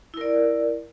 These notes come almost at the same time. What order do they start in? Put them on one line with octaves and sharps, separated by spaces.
E4 A#4 D5